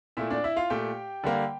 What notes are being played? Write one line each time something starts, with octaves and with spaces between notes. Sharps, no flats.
A#2 A3 E4 E5
D4 D5
E4 E5
F4 F5
A#2 A3 G4 G5
D3 G3 A#3